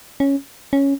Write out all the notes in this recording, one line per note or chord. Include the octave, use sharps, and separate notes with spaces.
C#4
C#4